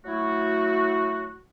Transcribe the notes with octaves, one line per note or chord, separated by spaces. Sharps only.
F#3 A3 E4 F#4